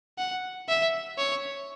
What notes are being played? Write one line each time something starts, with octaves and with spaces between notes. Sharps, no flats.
F#5
E5
C#5